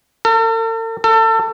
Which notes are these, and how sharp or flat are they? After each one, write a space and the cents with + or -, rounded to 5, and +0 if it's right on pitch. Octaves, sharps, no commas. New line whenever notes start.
A4 +45
A4 +30